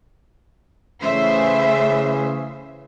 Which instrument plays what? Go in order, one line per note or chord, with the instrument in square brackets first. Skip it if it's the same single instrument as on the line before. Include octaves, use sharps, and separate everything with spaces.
[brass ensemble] C#3 E3 [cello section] A3 C5 E5